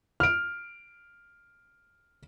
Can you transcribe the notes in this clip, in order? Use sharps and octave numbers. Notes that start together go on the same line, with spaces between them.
F6 D7